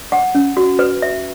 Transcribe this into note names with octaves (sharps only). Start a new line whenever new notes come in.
F#5
C#4
F#4
B4
E5